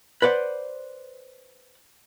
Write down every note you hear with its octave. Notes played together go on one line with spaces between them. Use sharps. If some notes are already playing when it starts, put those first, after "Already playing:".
B4 C5 D5 F#5